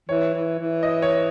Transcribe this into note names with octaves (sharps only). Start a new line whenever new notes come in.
E3 C#5
E3
E3
D#5
C#5